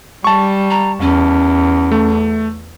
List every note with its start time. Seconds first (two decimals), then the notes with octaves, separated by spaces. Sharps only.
0.24 G3 A5 C#6
0.70 A#5
1.01 E2 C#4
1.92 A3